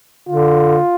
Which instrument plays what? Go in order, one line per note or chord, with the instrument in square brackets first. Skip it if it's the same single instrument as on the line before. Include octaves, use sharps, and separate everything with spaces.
[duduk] D3 [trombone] F4